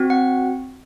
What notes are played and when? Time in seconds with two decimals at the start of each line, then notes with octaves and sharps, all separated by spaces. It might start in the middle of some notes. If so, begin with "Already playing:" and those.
Already playing: C4 F#4
0.10 F#5